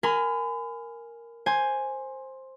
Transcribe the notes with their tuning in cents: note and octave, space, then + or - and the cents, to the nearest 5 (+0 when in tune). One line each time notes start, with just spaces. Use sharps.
A#4 +0 G#5 +0 B5 +40
C5 +10 G#5 +0